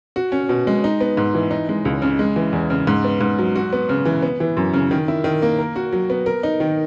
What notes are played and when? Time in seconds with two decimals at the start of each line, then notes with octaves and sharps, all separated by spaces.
0.16 F#4
0.32 C#4
0.49 B2
0.67 G#3
0.84 D#4
1.00 B3
1.17 G#2
1.34 E3
1.51 D#4
1.69 G#3
1.85 C#2
2.02 C#3
2.19 G#3
2.36 E3
2.53 E2
2.70 C#3
2.87 G#2
3.04 B3
3.21 G#2
3.39 F#3
3.56 F#4
3.73 B3
3.89 C#3
4.05 E3
4.22 B3
4.40 E3
4.57 F#2
4.74 C#3
4.91 D#3
5.08 E4
5.24 D#3
5.42 A#3
5.59 A#4
5.76 F#4
5.92 F#3
6.10 B3
6.26 A#4
6.43 D#4
6.60 D#3